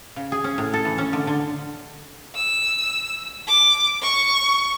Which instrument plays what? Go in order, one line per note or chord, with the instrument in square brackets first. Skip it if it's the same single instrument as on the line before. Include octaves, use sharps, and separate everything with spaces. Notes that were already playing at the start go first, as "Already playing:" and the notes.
[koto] C#3
G#4
C#4
A2
A4
E3
C#4
D3
D3
[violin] E6
D6
C#6